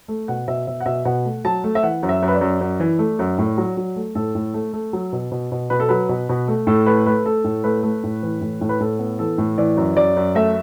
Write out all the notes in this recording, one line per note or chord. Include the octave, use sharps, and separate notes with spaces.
A3
B2 F#5
B2 E5
B2 E5
F#5
B2 E5
B2 F#5
A3
F#3 A5
A3
E5
E3 F#5
F#2
E5
F#2
B4
D5
F#2
F#2
E3
A3
F#2
A2
F#3
F#3
A3
A2 A4
A2
A3
A3
F#3
B2
B2
B2
B2 B4
A4
F#3 B4
B2
B2
A3
A2 A4
A3 B4
A3 B4
A3 A4
A2
A3 B4
A3
A2
E3
A2
A2
B4
A2 A4
B3
E3 A4
A2
E3 D5
F#2
F#2 D5
F#2
A3 E5